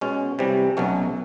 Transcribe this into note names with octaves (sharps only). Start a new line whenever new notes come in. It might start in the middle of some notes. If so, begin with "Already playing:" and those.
B2 G#3 C#4
C3 E3 G3
B1 B2 F#3 A3 C#4